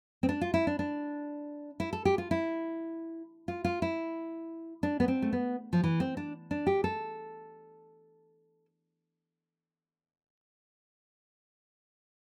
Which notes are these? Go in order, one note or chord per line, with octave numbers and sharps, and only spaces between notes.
C4
D4
F4
E4
D4
D4
E4
A4
G4
F4
E4
F4
F4
E4
D4
B3
C4
A3
B3
F3
E3
C4
D4
D4
G4
A4